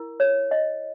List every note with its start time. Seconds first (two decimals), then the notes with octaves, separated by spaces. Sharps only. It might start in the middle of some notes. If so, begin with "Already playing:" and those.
Already playing: E4 A#4
0.20 C#5
0.51 D#5